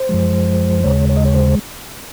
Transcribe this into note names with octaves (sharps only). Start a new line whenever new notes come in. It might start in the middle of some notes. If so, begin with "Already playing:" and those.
Already playing: C5
F#2 F3 G#3
D#2 C#3 G#3 C#5
C#5
D#5
C#5
C5